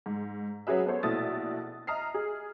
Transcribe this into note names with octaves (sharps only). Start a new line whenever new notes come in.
G#2
F#3 C#4 G#4 B4 E5
B3 A4 C5 C#5
A#1 B2 A3 E4 D#6 A6
D#5 E5 A#5 D#6 F6 C7
G#4